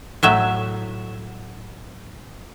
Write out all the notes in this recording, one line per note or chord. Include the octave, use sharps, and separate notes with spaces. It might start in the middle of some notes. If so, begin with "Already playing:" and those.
A2 F#3 E5